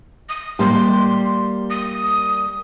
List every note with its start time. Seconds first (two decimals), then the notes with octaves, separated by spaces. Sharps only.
0.29 D#6
0.59 G3 A#3 G4 C6
1.70 D#6